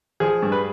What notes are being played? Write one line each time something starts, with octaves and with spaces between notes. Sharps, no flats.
F3 G#4
G2
B4